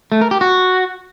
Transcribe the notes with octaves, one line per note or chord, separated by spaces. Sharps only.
A3
A#4
G4
F#4